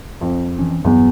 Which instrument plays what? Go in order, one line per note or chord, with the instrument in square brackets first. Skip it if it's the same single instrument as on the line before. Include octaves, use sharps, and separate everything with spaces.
[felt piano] F2
[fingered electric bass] E3 C#4
[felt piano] E2 [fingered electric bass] G2 F#3 B3